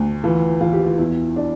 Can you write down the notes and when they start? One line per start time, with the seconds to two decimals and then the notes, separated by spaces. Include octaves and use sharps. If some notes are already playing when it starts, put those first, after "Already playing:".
Already playing: D2
0.24 E3 F4
0.61 E3 F4
0.73 G4
0.85 F4
0.98 E2 E4
1.36 D4